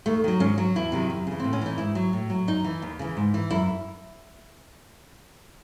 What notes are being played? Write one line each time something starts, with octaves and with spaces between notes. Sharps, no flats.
D#2 A3
D#3 F#3
G#2 C#4
F#3
E2 E4
C3 D#3 F#3
F#2
C#3 E3
A2 C4
C#4
E3 D#4
G#2 E4
F#3
A2
F#3
F#2 D#4
E3
D#2
C#3 E3
G#2
E3
F#2 E4